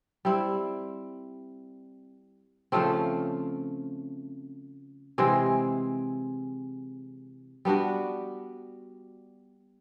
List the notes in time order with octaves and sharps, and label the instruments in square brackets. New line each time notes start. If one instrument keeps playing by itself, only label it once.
[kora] G3 C4 E4
C#3 F3 A3 C4
C3 E3 G#3 C4
G3 B3 D4 F#4